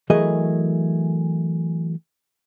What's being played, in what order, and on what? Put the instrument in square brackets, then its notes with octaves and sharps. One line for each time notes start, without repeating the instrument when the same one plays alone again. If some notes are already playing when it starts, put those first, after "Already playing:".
[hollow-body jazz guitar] E3 F#3 A3 G#4 A#4 D#5